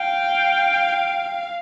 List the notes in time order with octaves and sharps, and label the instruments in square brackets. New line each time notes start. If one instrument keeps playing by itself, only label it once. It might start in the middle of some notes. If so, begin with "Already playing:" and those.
Already playing: [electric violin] F5 [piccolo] G5